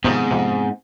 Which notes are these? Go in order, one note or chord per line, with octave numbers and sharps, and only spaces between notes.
G#2 C3 D#3 F3 B3 C4
F2 C3